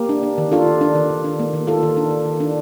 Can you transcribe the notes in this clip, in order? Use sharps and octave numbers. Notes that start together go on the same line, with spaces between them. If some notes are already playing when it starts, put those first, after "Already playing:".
Already playing: A#3 G4 A#4
D4
D4
D#3
D4 F4 A4
D#3
D4
D#3
D#3
D4
A#3
D#3
A#3 F4 A4
D#3
D4
D#3
D#3
D4